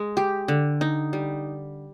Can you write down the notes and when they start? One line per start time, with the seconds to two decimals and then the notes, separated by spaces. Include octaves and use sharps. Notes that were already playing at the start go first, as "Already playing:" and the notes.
Already playing: G#3
0.17 G4
0.48 D3
0.81 D#4
1.13 G3